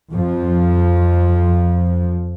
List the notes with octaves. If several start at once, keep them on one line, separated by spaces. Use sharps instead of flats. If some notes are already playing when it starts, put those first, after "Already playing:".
F2 F3